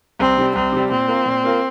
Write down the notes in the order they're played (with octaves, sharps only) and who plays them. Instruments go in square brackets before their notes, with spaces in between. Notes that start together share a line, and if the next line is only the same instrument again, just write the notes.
[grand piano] C2 [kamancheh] C4
[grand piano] C3 G3
[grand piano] C2 [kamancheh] C4
[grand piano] C3 G3
[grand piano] A#2 [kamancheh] C4
[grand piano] A#3 F4 A#4
A#2
A#3 F4 A#4